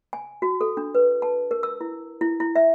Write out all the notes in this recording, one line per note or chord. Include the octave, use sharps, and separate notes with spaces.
G#5
F#4
A4
D4
B4
A5
A#4
E6
E4
E4
E4
E5